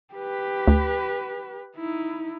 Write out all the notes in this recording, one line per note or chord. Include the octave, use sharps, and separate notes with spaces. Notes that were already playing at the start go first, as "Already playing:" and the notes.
G4 B4
D2
D#4 E4